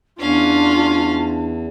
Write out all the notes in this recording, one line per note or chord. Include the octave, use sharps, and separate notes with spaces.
E2 C#4 D4 F4 F5